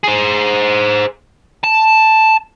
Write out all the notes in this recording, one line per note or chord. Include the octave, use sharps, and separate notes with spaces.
G#4 C5
A5